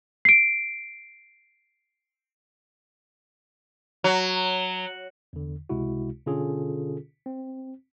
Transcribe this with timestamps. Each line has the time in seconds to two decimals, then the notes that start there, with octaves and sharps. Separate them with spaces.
0.25 C7 D7
4.04 F#3
5.33 E2 D3
5.69 C#2 C3 G#3 E4 F#4
6.26 B2 D3 C#4 F4 G#4 A4
7.26 C4